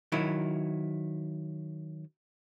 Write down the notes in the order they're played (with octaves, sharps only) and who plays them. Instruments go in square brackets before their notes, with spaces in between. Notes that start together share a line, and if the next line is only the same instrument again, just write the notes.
[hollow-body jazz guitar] D#3 F#3 E4